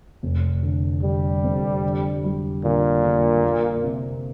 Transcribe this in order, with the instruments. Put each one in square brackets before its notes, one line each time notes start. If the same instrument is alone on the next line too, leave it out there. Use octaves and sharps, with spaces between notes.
[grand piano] F1
D3
[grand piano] D3 [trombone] G3
[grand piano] F2
D3
G3
[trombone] A#2 [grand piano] D3
[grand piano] D3
A#3
C3